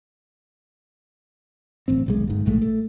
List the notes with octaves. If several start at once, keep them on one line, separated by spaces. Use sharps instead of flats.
D1 A1 C4
D#1 B1 G#3
G1 G#2
A#1 A2 G#3 A3
A3